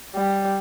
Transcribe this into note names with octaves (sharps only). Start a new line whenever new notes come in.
G3